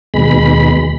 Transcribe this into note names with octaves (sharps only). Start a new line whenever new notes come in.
D#2 B2 G#3 B5